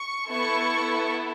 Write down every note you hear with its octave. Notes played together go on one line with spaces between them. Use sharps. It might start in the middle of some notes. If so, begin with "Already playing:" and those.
Already playing: C#6
B3 E4 A4 C#6